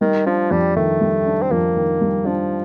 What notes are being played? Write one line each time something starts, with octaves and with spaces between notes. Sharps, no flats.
D#3 G3
F3 D4
F2 G3
D#3 A3
G3
D4
C4
F2 A#3
D#3
G3
F3 D4